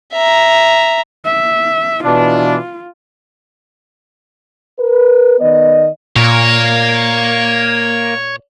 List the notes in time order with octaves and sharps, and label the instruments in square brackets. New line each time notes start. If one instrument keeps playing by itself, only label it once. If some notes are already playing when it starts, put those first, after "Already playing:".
[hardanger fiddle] E5 A#5
[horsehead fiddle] E5
[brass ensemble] B2 E3 D4 [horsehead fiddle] F4
[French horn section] A#4 B4
D#3 B3 D5 D#5
[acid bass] A#2 [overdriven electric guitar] A#3 A#4 [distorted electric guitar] C#5